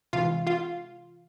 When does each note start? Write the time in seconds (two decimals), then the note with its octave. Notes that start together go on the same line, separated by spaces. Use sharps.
0.13 C3 E3 G#3 F4 F5
0.47 F4 F5